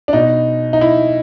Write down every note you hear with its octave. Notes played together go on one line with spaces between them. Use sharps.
D4
B2 D#4
D#4
E4